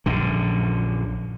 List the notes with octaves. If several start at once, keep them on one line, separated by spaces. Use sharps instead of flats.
A#1 F#2 D3